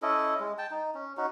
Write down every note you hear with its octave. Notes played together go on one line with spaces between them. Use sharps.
C#4 E4 A4 D#5
G#3
G5 A5
D#4
C#4
C#4 D#4 F#4